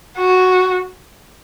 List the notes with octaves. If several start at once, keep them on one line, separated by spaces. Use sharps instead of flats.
F#4